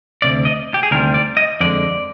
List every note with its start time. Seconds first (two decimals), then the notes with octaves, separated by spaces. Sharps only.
0.22 D2 C3 D5
0.45 D#5
0.74 G4
0.83 G#4
0.91 D2 C3 D#3 G3 A#4
1.14 D5
1.37 D#5
1.61 F2 D3 G#3 D5